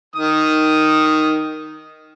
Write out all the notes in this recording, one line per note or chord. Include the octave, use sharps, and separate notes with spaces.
D#3 D#6